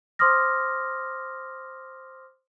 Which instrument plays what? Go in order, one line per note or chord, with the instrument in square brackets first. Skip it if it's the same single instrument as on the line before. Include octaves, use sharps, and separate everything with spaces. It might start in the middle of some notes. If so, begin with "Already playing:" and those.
[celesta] C5 C6 D6 D#6 F6 A#6